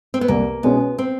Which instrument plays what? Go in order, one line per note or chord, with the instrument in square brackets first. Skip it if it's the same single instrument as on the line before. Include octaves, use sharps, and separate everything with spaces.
[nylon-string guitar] C4
B3
[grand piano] C2 [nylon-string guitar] A#3
[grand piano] B2 G#3 C#4 [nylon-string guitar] B3
[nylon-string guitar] C4